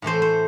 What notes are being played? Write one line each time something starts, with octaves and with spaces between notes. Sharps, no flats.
A2 E3 A3 C5
C5